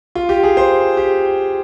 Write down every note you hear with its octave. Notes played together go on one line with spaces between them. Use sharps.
F4
G4
G#4
C5
G4